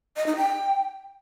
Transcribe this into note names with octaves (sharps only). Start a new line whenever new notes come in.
D#5
D#4
G5